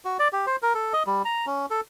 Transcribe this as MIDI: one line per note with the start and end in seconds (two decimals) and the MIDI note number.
0.05 0.17 66
0.19 0.28 74
0.33 0.46 67
0.47 0.56 72
0.62 0.73 70
0.74 0.93 69
0.93 1.03 75
1.07 1.22 55
1.25 1.46 82
1.46 1.66 61
1.70 1.81 69